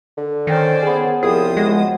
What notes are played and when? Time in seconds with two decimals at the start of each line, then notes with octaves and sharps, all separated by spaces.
0.17 D3
0.47 D#3 C#4 C5 D5 F5 G5 A#5
0.83 B3 G#4 C#5 G#5
1.23 C2 F3 F4 G#4 C5 C#5 G5 D#6
1.57 G#3 F#4